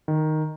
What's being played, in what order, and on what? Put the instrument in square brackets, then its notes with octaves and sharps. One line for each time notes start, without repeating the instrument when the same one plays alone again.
[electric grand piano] D#3